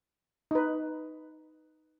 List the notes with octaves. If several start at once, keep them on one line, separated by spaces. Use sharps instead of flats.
D#4 B4